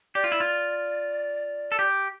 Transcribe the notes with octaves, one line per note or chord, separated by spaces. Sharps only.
G4 D5
F4
E4
F4
A4
G4